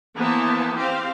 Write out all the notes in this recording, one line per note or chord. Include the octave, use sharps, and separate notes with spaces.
E3 A#3 B3 C5 A5
C4 G4 C5 F5